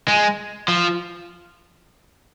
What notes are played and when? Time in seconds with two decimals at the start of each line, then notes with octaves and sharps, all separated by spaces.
0.08 G#3
0.68 F3